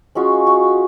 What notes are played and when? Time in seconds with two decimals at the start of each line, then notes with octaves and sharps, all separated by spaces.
0.15 G#3 C#4 F4 F#4
0.47 F#4